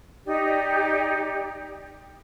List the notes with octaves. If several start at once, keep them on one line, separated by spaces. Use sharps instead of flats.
D#4 G4 D5